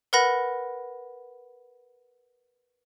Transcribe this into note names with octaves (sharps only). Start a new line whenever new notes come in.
A#4 B4 F#5 B5 A#6